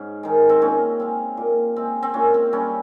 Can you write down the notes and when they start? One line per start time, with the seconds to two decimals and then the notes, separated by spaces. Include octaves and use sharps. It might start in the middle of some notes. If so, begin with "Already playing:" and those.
Already playing: G#2 C#4
0.23 D#3 G#3
0.49 C4
0.62 A#2 C#4
1.00 G#3 C4
1.37 A#2
1.76 G#3 C4
2.03 C4
2.14 A#2 C#4
2.34 C4
2.52 G3 C4 C#4